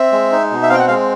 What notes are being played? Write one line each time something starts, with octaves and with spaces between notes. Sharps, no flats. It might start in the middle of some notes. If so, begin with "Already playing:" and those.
Already playing: C4 E5
G#3
D#4
B2
E5
C4 F5 G5
F#5
G#3 F5